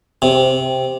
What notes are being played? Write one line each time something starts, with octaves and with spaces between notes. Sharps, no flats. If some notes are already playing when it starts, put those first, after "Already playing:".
C3